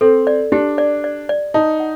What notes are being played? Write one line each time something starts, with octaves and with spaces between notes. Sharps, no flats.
C4 A4
D5
D4 G4
D5
D5
D5
D#4 A5
F#5